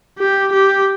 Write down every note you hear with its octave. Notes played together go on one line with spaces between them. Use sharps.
G4
G4